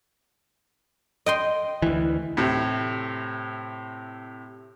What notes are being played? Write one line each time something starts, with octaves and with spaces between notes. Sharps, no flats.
D#5 G5 C6
D2 E3
A2 C3